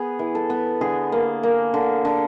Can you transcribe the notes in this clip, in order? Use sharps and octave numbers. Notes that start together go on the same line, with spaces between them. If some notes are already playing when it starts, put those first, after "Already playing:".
Already playing: B3 G#4
E3
A4
B3
D3 G#4
A#3
A#3
D3
D3